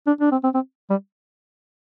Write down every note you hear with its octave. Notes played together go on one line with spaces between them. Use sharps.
D4
D4
C4
C4
C4
G3